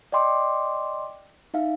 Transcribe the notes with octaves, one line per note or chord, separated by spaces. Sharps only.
D5 D#5 G5 C6 D6
D#4 E5 F5